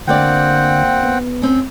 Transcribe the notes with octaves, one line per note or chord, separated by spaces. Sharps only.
D2 D3 A#3 C4 D5 F#5 G5
B3
C4 C#4